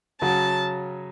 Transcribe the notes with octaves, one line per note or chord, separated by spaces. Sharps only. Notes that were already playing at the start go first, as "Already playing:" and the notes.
C#3 F#3 C#4 F#4 A5